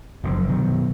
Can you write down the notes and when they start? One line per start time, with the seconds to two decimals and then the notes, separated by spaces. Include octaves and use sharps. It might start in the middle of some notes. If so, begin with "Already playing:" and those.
0.23 F#1 D3 F3
0.49 B2 D#3 F#3